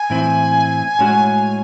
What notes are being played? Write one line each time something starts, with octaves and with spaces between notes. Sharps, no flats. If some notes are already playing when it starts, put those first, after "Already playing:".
Already playing: G#5
A2 E3 C4 E4
A2 G#3 C#4 F#4